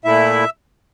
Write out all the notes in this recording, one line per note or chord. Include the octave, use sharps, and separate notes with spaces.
A#2 A3 E4 E5